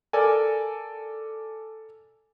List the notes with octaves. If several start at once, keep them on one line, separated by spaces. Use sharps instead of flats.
A4 A#4 D5 G#5